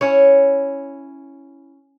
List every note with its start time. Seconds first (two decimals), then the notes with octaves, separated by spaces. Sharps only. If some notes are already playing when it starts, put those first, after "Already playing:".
0.01 C#4 E4 C#5